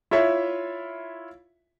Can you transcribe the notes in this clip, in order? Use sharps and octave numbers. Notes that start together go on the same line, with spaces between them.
E4 F4 C#5 E5